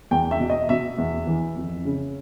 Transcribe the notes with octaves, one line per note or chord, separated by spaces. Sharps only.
E2 G5
E5
B2
D#5
B2 E5
E2
E3
F2
C#3